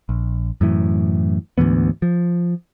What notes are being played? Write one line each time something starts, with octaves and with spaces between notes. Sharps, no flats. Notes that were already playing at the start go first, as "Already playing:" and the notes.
A#1
F#2 A2 E3
D2 G#2 E3 B3
F3